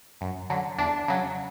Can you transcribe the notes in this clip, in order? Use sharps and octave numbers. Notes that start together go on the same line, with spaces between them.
F#2
D3 F#3
E2 D4
C#3 F#3